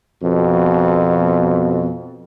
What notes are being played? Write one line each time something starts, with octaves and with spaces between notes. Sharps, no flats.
F2 B2